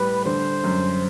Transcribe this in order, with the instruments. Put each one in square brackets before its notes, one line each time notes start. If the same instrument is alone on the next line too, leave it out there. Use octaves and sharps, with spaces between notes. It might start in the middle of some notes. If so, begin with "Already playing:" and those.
Already playing: [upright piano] A2 G3 [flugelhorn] B4
[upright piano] D3 [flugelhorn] C5
[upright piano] F#2